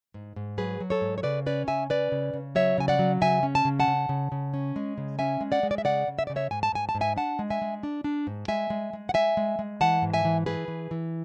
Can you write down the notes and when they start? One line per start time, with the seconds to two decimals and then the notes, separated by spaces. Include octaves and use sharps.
0.14 G#2
0.36 G#2
0.58 F#3 G#4 B4
0.80 F#3
0.90 A4 C#5
1.01 G#2
1.18 C#5
1.23 C#3 B4 D5
1.46 C#4 B4 D5
1.67 C#3 E5 G#5
1.90 C#4 B4 D5
2.12 C#3
2.34 C#3
2.55 F#3 C#5 E5
2.78 C#3 G#5
2.88 D5 F#5
2.99 F#3
3.21 C#3 E5 G#5
3.43 C#4
3.55 A5
3.65 C#3
3.80 F#5 A5
3.88 C#3
4.09 C#3
4.32 C#3
4.54 C#4
4.76 G#3
4.98 C#3
5.19 C#4 E5 G#5
5.41 G#3
5.52 D5 F#5
5.63 G#3
5.71 D5
5.78 E5
5.85 C#3 D5 F#5
6.08 C#3
6.19 E5
6.27 C#3 D5
6.36 C#5 E5
6.51 G#2 G#5
6.63 A5
6.73 G#2 G#5
6.89 A5
6.95 G#2
7.01 E5 G#5
7.16 D4 F#5 A5
7.39 G#3
7.50 E5 G#5
7.62 G#3
7.83 D4
8.04 D4
8.27 G#2
8.48 G#3 E5 G#5
8.70 G#3
8.93 G#3
9.09 F#5
9.14 G#3 E5 G#5
9.37 G#3
9.59 G#3
9.81 E3 F#5 A5
10.02 G#2
10.14 E5 G#5
10.25 E3
10.46 E3 G#4 B4
10.68 E3
10.91 E3